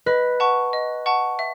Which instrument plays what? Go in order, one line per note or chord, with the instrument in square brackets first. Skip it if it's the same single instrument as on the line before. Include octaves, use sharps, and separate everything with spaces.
[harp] B4 [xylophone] D#5
[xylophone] F#5 A5 C#6
D#5
F#5 A5 C#6
E5